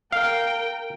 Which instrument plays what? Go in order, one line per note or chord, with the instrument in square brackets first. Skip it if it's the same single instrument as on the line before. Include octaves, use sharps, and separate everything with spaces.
[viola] A#4 G5 [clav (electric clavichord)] F5